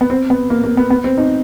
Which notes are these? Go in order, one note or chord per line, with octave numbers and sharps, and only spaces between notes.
B3
C4
B3
A#3
A#3
B3
B3
C4
D#4